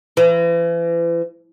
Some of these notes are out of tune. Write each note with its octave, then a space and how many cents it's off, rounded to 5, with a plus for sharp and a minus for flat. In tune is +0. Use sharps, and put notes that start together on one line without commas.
E3 +40